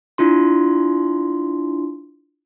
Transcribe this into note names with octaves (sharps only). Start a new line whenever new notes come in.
D4 E4 F4 C6